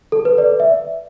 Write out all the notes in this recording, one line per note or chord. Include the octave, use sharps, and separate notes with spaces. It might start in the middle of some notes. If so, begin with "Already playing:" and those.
A4
B4
D5
E5